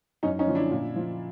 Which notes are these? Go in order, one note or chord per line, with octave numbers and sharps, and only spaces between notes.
F#2 C#4 D#4
C#4 D#4
D3 F3
D4 E4
A#2
F3